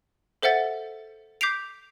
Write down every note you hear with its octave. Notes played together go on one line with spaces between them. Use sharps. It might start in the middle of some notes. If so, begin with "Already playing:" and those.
A4 C5 E5 F#5 A6
D6 G6 B6 C7 D7 F7